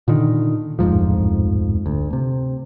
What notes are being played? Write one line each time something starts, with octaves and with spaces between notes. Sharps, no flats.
A#2 D3 D#3
D1 F2 G#2 F3
D2
C3